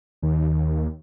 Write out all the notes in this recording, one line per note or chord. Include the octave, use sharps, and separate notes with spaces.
D#2 D#3